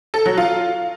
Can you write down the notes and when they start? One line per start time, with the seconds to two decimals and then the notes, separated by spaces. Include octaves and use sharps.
0.14 A4
0.26 F#3
0.37 F4